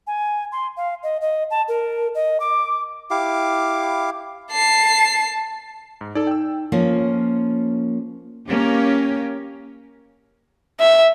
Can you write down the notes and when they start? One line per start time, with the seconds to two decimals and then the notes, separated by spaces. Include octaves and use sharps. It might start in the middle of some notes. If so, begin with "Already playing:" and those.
0.07 G#5
0.52 C6
0.77 F5
1.03 D#5
1.21 D#5
1.51 A5
1.68 A#4
2.15 D#5
2.40 D6
3.11 E4 G4 F5 D6
4.51 A5 C7
6.01 G#2
6.15 D#4 A4 D5
6.27 G5 E6
6.72 F3 A#3 C#4
8.48 A#3 C#4 G4
10.80 E5